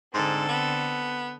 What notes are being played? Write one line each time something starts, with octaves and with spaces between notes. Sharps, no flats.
G#2 D3 C4 A4
B3